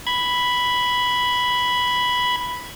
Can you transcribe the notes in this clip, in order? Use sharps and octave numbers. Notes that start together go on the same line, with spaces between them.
B5 G#6